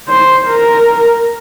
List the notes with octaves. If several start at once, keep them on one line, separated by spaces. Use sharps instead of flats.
C5
A#4